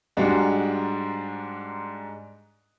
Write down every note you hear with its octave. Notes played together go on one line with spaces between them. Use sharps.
G#2 G3 G#3 D4 D#4 F#4